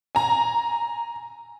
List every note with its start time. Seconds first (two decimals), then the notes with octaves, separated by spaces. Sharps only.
0.15 G#5 A#5